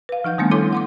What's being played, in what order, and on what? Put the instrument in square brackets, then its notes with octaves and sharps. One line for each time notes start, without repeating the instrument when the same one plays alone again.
[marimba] B4 F5
F3 D#4 F#5 G6
D#3 G3 A3 B3 C#4 D4
D4 E4 A4 C#5 C6 D6
F#5 C6 D6